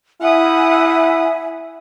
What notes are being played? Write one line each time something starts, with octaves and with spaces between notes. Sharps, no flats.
E4 E5 F#5 G#5 D#6